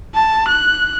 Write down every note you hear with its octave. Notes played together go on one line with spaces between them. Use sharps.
A5
F#6